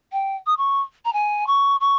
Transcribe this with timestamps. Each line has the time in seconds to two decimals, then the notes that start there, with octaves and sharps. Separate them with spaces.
0.12 G5
0.46 D#6
0.57 C#6
1.05 A#5
1.13 G#5
1.47 C#6
1.80 C#6